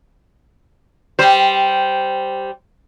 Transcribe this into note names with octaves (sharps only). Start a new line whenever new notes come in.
G3 C5